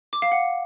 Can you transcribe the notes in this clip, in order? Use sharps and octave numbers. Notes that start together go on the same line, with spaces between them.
D6
F5
F#5